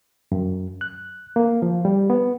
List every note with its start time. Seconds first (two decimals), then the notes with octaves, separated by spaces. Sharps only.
0.32 F#2
0.81 F#6
1.36 A#3
1.62 F3
1.85 G3
2.10 B3